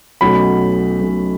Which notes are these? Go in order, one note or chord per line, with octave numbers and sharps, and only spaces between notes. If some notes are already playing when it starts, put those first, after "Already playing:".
B1 B2 A3 C#4 B5
B1 B2 A3 C#4